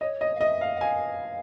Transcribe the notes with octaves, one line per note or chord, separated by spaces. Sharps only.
C#5 D#5
D#5
F5
D#5 E5
F5
F#5
F5 G#5